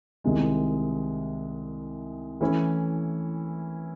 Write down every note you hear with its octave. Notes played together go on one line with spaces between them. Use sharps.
C2 C3 D#3 G#3
E3 A3 C#4 E4